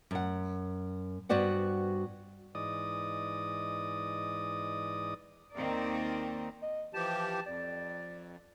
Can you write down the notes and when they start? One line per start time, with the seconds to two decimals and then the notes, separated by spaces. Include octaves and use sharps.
0.11 F#2 F#5
1.29 G2 B3 F#4 C5 D5 F#5
2.55 G#2 E3 D5 D#5 D#6
5.55 D#2 D#3 A#3 C4 A#4 D5
6.62 D#5
6.94 E3 F3 G4 A5
7.46 F2 D5